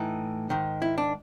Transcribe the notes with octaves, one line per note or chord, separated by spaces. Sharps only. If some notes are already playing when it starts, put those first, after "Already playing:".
Already playing: A2 E3 D#4
G#2 D#3
E4
D4